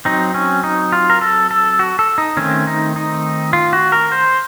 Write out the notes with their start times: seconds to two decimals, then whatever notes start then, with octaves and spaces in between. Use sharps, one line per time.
0.05 F#3 C4 D#4
0.35 C#4
0.64 D#4
0.93 F4
1.10 A#4
1.21 A4
1.51 A4
1.79 F#4
1.99 A4
2.18 D#4
2.37 D#3 A3 C4 C#4
2.67 D#4
2.96 D#4
3.53 F4
3.73 F#4
3.92 A#4
4.12 C5